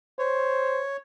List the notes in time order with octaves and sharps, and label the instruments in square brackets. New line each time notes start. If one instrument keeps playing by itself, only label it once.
[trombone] C5 [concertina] C#5